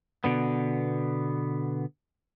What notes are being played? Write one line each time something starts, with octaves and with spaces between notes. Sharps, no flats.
B2 D3 B3